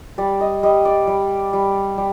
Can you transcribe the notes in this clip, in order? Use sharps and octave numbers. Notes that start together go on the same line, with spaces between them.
G3 D5
D#5
G3 D#5
D5
G3
G3
G3